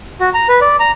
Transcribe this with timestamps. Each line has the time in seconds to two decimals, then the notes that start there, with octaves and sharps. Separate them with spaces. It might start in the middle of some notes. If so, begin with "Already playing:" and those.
0.20 F#4
0.34 A#5
0.49 B4
0.61 D5
0.80 A#5